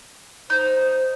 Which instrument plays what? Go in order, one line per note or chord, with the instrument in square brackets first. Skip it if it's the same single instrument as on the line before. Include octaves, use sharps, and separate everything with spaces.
[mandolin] D#4 [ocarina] C5